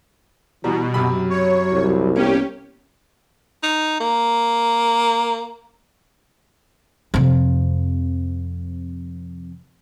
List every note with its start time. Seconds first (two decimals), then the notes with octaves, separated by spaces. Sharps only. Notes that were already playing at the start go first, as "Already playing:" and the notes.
0.64 B2 E3 G3 A#5
0.94 F#2 C3 F#3 B5
1.30 C#5
1.73 C2
2.16 A#3 B3 C#4 G4
3.63 D#4
4.00 A#3
7.14 F2 C3